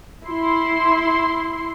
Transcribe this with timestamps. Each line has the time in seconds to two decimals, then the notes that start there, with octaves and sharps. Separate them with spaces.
0.25 E4 C6